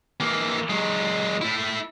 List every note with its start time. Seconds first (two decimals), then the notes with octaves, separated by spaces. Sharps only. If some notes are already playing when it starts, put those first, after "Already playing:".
0.20 E3 A#3
0.70 F#3 G#3
1.41 A3 E4